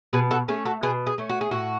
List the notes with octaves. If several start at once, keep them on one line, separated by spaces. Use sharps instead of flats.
B2 G#4 B4
F#4 A4
A3 C#4 G#4
F#4 A4
B2 G#4 B4
G#4
A3 C#4
F#4
G#4
A2 F#4